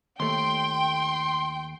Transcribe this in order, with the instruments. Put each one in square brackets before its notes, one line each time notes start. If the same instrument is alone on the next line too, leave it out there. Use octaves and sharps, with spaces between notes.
[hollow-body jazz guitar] D#2 A3 [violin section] G5 [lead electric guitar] C6